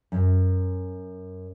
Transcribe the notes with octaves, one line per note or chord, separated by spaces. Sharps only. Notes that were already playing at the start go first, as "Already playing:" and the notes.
F#2